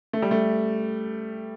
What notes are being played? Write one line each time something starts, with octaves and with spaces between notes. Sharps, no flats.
A3
G3
A3